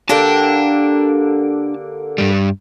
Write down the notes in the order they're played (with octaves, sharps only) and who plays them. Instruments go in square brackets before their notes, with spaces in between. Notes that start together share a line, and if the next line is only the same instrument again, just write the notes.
[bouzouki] D3 A#3 G4 [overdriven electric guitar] D4 A5
[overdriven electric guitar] G2 G3